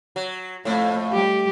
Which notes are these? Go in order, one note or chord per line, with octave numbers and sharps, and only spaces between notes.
F#3
F2 A2 A3
G3 G4